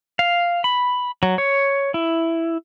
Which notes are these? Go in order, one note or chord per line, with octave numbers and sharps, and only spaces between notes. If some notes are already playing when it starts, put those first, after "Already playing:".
F5
B5
F#3
C#5
E4